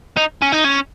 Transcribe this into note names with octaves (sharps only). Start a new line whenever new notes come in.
D#4
C#4
D#4
C#4